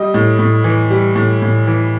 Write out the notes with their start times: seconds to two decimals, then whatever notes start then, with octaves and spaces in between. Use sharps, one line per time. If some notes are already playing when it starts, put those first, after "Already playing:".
Already playing: G3 D#5
0.14 A2
0.39 A2
0.64 E3
0.90 G3
1.16 A2
1.42 A2
1.67 E3